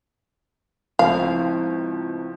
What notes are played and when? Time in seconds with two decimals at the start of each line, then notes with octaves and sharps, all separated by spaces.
0.99 C#2 A2 F3 C4 F5